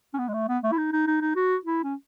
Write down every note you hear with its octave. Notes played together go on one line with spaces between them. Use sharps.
C#4
B3
G#3
A3
B3
A3
E4
D#4
D#4
D#4
D#4
F#4
E4
C#4